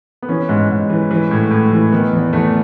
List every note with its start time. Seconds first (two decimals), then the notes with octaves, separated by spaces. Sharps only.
0.22 B3
0.29 E3 C#4
0.49 G#2
0.70 G#2
0.90 E3
1.11 E3
1.31 A2
1.51 A2
1.72 E3
1.93 D#3 B3
2.13 E2
2.33 E2 A3